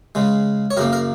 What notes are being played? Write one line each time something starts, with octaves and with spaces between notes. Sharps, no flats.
C#3 G#3
C#5
F#2 C#3 A#3 A#4
A#4